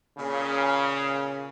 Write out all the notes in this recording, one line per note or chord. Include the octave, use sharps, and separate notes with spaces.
A#2 C#3